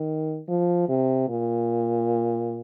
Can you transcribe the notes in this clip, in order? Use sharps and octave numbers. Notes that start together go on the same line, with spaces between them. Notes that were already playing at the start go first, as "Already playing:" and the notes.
Already playing: D#3
F3
C3
A#2